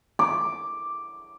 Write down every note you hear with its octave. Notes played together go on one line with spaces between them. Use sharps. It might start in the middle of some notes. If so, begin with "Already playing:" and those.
D6